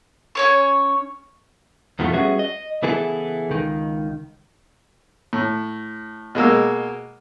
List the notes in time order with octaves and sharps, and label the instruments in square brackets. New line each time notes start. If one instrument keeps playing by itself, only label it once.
[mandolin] C#4 C#5 C#6
[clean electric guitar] E2 B2 D#3 F3 A3
G3 B3 C#4 F#4 G#4 E5
D#5
C#3 E3 B3 E4 G#4 A4
C#2 D#3
[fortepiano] A2
B2 G#3 A#3 E6